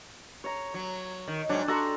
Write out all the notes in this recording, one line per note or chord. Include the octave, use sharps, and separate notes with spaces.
C#5 A#5
F#3
D#3
G#2 F#3 D4 G5
F#4 A4 A#5 C6